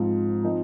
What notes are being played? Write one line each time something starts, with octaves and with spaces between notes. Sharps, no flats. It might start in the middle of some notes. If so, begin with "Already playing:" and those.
Already playing: G#2 F3 C4 F4
F3 C4 D#4